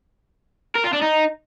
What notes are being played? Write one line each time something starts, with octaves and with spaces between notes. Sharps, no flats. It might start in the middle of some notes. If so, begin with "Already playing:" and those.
A#4
F4
D4
D#4